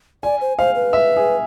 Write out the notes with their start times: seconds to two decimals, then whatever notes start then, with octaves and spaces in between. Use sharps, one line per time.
0.23 D5 G#5
0.41 C5
0.59 C5 F5
0.75 B4
0.93 E5
1.16 G#4